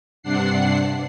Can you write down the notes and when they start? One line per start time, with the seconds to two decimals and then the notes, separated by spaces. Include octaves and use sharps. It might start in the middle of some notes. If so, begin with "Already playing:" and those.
0.23 G2 C3 D4 F#5 C7